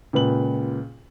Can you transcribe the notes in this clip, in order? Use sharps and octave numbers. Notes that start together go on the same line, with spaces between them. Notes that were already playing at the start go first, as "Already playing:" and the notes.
C#2 A#2 B4 F#7